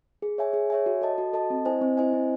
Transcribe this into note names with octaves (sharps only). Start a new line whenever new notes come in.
G#4
C#5 E5 G#5
G#4
C#5 E5 G#5
F#4
A4 D#5 A5
F#4
A4 D#5 A5
C4
E4 C5 D#5 G#5
C4
E4 C5 D#5 G#5
C4